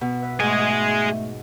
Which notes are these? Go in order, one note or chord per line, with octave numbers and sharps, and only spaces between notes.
B2
B4 E5
G#2 G#3 A3 G#4